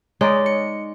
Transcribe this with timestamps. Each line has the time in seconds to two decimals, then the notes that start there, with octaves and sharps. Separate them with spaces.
0.21 G#3 D#4 C#5 D5
0.46 C#7